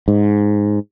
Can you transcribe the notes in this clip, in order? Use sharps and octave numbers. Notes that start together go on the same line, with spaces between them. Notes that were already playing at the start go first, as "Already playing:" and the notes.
G#2